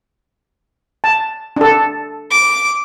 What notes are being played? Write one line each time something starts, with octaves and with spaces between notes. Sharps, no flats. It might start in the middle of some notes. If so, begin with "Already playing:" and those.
A5
D4 A4
D6